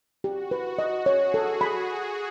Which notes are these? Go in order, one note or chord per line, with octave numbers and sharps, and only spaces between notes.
F#4 G4
B4
D#5
G#4 C#5
A4
B5